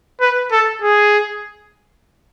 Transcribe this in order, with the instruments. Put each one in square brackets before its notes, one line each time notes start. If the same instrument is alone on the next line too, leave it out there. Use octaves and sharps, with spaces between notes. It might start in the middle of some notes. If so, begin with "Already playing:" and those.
[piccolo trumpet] B4
A4
G#4